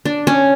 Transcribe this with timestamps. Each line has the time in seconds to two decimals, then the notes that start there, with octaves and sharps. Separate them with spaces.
0.05 D4
0.27 C#4